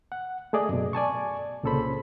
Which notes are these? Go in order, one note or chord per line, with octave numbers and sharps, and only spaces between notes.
F#5
A3 G#4 D5 D#5
F#2 B2
D5 G#5 A5 C#6
C2 A#2 C#3 A4 C5 B5